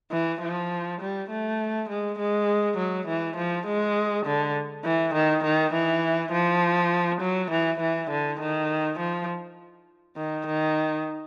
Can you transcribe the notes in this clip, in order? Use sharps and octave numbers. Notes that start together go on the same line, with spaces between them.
E3
F3
G3
A3
G#3
G#3
F#3
E3
F3
G#3
D3
E3
D#3
D#3
E3
F3
F#3
E3
E3
D3
D#3
F3
D#3
D#3